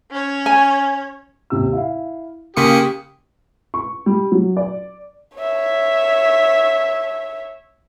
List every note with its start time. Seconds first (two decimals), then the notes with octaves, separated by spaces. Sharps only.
0.11 C#4 C#5
0.46 G#5
1.50 D#2 C3 E6
1.73 E4 F5
2.57 C#3 A#3 G4 C6 C#6 D#6 B6 C#7
3.74 C#6
4.06 G3
4.32 F#3
4.57 D5
5.37 C#5 E5